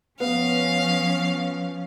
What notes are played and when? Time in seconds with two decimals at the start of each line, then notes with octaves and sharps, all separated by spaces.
0.20 F3 B3 C#4 F5